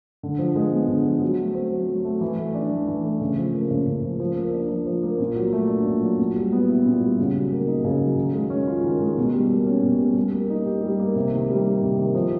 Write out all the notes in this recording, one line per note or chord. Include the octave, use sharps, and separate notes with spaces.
D3
F3
G#3
B3
D3
F3
F#3
A3
C4
F#3
F#3
A3
E3
A3
D4
E3
E3
A3
C#3
F3
A#3
C#3
C#3
F3
F3
A#3
D4
F3
F3
A#3
A#2
F#3
A3
D4
A#2
F#3
A#2
G3
B3
E4
A#2
G3
C#3
F#3
A#3
D#4
C#3
F#3
D#3
G#3
C#4
F4
D#3
G#3
B2
G3
A#3
C#4
B2
G3
G3
A#3
D#4
G4
G3
A#3
C3
D#3
G3
A#3
C3
D#3
F3